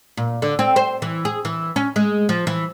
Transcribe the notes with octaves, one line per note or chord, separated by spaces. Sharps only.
A#2
D3
C4
C5
E3
G#4
E3
C#4
G#3
F3
E3